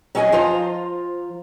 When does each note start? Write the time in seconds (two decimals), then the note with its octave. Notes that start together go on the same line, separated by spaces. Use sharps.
0.15 F#3 C#4 F#4 D#5 G#5
0.32 F3 F4 C5 A#5